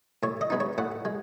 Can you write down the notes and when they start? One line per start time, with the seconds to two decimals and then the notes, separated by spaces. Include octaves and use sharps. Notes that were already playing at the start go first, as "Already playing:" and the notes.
0.23 A2 C#5
0.41 D#5
0.50 G#3 B3 D#4
0.60 C#5
0.78 A2 F#5
1.05 G#3